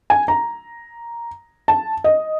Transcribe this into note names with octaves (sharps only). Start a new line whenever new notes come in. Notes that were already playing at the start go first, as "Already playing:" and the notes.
G#5
A#5
A5
D#5